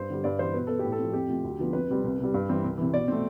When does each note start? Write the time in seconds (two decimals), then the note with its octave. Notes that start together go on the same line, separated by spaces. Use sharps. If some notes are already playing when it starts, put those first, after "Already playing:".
Already playing: G2 C5
0.10 D3 G3
0.24 G2 D5
0.39 E3 G3 C5
0.54 B2 B4
0.67 B3 A4
0.79 G4
0.84 A2
0.92 A4
0.99 F3 C4
1.13 F2 G4
1.28 C3 F3 A3
1.44 D2
1.59 D3 F3 B3
1.73 F2 B4
1.89 C3 G3 C4
2.04 C2
2.19 C3 G3
2.34 G2
2.49 E3 G3 C4
2.64 C2
2.78 C3 E3
2.93 B2 D5
3.08 A3 C4